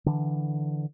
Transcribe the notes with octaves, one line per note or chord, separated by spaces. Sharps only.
D3 E3